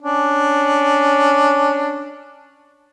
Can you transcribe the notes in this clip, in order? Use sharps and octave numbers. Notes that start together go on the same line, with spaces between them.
C#4 D4